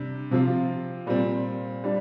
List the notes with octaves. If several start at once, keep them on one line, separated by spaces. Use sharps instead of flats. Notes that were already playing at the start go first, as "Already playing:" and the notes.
Already playing: C3 G3 D4
C3 F3 C4 F4
A#2 G3 C4
G3 D4